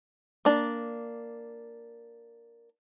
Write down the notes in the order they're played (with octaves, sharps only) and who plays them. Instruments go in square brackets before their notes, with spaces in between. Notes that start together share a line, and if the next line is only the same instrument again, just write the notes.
[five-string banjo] A#3 D4